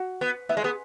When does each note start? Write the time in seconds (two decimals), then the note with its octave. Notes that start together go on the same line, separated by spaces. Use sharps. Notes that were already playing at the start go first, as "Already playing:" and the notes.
Already playing: F#4 F#5
0.21 B3
0.49 B3 E4 E5
0.57 G#3
0.64 B3 G#4